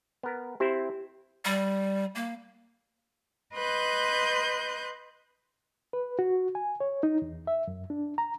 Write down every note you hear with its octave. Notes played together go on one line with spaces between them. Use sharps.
B3 A#4
C4 E4 G4 C5
G3
A#3
B4 D#5 C6 F#6 G6
B4
F#4
G#5
C#5
D#4
E2
E5
F#2
D4
A#5